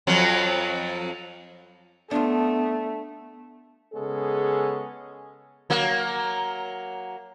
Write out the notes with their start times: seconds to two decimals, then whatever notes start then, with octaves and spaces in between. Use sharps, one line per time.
0.07 F2 F3 F#3
2.11 A3 B3 D4 F4
3.94 C#3 G#3 B3 C#4 G#4 A4
5.70 F#3 A#3